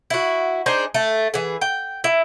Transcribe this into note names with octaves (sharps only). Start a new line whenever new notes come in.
E4 F#4
D4 D#4 G#4 C5
A3
E3 G#4
G5
E4